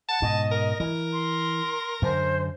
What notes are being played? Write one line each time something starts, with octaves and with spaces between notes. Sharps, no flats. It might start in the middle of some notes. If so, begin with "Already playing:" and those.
F#5 A5
G#2 B2 D#5
A#4
E3 A#4
C6
F#2 D3 C5